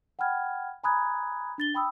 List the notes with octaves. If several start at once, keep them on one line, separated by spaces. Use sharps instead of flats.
F#5 G5 B5 F6 G#6
G#5 A#5 B5 D#6 F#6 G#6
D4 A6 G7
G5 B5 D#6 E6